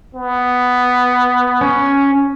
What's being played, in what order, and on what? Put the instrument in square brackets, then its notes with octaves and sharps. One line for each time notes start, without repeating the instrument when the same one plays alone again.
[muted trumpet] B3
[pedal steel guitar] C#4